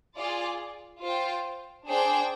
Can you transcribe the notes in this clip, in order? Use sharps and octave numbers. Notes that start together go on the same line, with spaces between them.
F4 G#4 D5
F4 C5 G5
D4 G#4 C5 G5